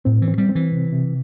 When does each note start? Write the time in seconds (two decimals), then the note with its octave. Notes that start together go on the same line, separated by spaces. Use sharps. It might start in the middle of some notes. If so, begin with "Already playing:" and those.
0.05 A2 C4
0.22 E3
0.28 C4
0.38 G3
0.49 C4
0.55 E3
0.72 C3
0.93 C3